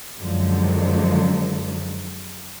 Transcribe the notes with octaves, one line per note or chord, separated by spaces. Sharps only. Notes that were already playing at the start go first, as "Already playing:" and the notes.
F#2 D3 D#3 F3 G#3